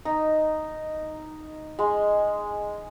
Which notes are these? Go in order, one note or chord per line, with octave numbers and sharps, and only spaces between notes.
D#4
G#3